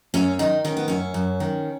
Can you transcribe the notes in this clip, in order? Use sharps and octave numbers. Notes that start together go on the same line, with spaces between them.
F#2 C#4
D#3 D#4
D#3 C#4
B3
F#2 C#4
F#2
D#3